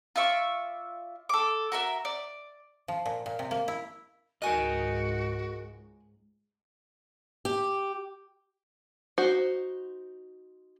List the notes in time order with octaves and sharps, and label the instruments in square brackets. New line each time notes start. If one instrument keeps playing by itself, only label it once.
[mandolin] F4 D5 E5 C#6
A4 D6
F#4 A#4 E5
D5
[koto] F3
A#2
A#2
C3
A#3
E4
[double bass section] C#2 G#2 G#3 [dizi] F#4 [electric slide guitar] A#4 D#5 [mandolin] G#5 F#6
[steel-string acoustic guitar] G4
[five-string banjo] D#4 F#4 C5